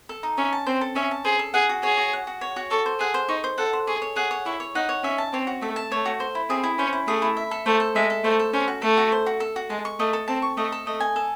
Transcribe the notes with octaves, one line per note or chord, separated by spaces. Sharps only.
A4
D#4
C#4 E5
A5
C4 C5
A4
C#4 E5
A5
G#4 C5
A4
G#4 F#5
F#4
G#4 C#5
F#4
F#5
F#4
C#5
F#4
A4 C#6
C5
G#4 F#5
C5
D#4 C#6
C5
A4 F#5
C5
G#4 C#6
C#5
G#4 F#5
C#5
E4 C#6
C#5
D#4 F#5
C#5
C#4 E5
A5
C4 C#5
F#4
A3 E5
A5
A3 C#5
F#4
C5
E4
C4 G#4
E4
C#4 C5
E4
A3 G#4
E4
E5
A4
A3 C5
A4
G#3 E5
A4
A3 C5
A4
C#4 C5
F#4
A3 A4
F#4
C5
F#4
A4
F#4
G#3 A5
C#6
A3 D#5
A4
C4 A5
C#6
A3 D#5
A4
A3 D#5
G#5
A4